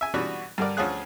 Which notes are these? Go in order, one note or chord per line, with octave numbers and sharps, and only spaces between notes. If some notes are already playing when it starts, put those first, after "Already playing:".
E5 G#5
B2 E3 G3 B3 D4 F#4
G2 D3 A#4 D5
D2 F3 C#4 F4 G#4 F#6